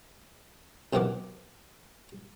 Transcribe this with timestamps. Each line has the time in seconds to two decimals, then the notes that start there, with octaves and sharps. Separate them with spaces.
0.93 B1 C3 D#3 E3 F#5 D6